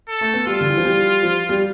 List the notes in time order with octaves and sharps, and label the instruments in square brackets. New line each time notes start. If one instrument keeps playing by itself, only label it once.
[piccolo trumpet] A4
[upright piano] A3
B3
[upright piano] G3 [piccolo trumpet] F4
[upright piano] D3
E3
F3
G3
F3
G3